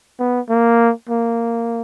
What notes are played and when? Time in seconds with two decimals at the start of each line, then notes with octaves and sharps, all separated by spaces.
0.19 B3
0.49 A#3
1.09 A#3